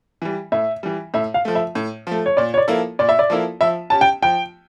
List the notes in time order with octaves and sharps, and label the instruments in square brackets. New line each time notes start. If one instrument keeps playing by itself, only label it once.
[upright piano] E3 G3
[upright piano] A2 [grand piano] E5
[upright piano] E3 G3
[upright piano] A2 [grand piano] E5
[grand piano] F5
[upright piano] F3 A3
[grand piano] E5
[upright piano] A2
F3 A3
[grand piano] C#5
[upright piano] A#2 [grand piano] D5
[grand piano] C#5
D5
[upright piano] F3 A#3 E4 A4
[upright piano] A#2 [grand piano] D5
[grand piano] E5
D5
[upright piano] F3 A#3 E4 A4
[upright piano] F3 [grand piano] E5
[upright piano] C#4 G4 [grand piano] A5
[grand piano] G5
[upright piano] F3 [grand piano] G5